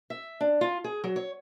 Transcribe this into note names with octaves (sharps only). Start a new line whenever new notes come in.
E5
D4
F4
G#4
F#3
C#5